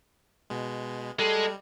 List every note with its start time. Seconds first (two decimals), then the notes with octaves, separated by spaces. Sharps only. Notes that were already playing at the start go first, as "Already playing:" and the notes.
0.50 B2 G#3
1.19 G3 G#3 A4